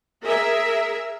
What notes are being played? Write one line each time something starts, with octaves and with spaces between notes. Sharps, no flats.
G#4 A#4 E5